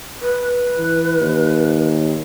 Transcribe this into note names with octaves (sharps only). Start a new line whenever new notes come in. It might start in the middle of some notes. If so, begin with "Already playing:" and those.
B4
E3
D#2